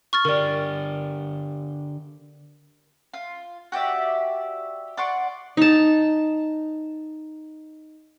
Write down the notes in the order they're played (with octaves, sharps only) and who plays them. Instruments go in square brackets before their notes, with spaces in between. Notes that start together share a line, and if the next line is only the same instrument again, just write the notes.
[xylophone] C#6 F6 A6
[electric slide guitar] D3 G4 [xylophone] A#4 D5
[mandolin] F4
F#4 G4 D5 E5
D5 F#5 C6 C#6
[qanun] D#4 A5